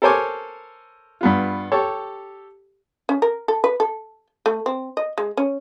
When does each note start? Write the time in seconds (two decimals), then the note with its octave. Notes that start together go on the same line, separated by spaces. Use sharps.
0.02 A4 A#4 C5 C#5 G#5 D6
1.21 G2 B3 F4
1.72 G4 A4 C#5
3.09 C#4
3.22 A#4
3.48 A4
3.64 B4
3.80 A4
4.46 A3
4.66 C4
4.97 D#5
5.18 G#3
5.37 C#4